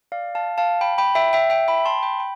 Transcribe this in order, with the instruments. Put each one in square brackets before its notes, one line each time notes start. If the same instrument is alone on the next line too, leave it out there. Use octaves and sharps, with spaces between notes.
[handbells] D5 F5
F5 A5
F5 A5
G5 B5
G5 B5
E5 G5
E5 G5
E5 G5
G5 B5
A5 C6
G5 B5
G5